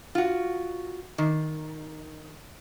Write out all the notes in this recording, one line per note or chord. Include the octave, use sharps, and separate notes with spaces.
F4 F#4
D#3